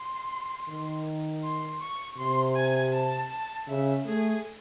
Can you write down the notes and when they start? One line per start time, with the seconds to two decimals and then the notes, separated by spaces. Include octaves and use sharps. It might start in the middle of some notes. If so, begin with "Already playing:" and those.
Already playing: C6
0.69 D#3
1.43 C6
1.81 C#6
2.18 C3 C6
2.56 G#5
2.94 A5
3.31 A5
3.68 C#3 E5
4.06 A3 G#4